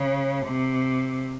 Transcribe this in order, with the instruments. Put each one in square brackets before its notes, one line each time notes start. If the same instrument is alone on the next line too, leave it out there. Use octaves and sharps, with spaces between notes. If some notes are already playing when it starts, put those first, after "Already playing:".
Already playing: [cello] C#3
C3